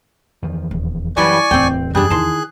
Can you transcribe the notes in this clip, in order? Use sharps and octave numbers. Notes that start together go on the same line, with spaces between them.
E2 D#3 F3
D#1
F#2 E3 G3 E4 D5 G#5 C#6
D1 E2 C4 G5
F#2 G3 D4 G#4 F#6
D#3 E4 A5 C6